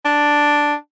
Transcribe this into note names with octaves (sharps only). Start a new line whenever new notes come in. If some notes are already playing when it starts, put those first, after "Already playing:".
D4